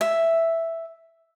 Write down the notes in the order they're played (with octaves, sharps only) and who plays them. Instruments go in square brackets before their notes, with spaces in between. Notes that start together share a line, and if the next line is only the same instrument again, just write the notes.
[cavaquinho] E5